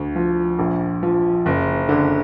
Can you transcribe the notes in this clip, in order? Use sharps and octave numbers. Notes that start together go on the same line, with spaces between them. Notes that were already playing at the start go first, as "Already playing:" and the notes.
Already playing: D2
F3
A#1
F3
F#1
D3